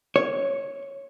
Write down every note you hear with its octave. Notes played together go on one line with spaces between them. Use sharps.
C#5